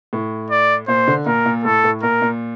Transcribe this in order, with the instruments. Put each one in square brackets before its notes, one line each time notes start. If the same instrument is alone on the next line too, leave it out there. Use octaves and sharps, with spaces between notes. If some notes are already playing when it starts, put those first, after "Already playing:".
[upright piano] A2
[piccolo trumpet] D5
[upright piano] A#2 [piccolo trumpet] C5
[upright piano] D3
[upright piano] A#2 [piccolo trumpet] A#4
[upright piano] A#2
[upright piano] A2 [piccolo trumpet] A4
[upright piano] A2
[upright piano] A#2 [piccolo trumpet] A#4
[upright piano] A#2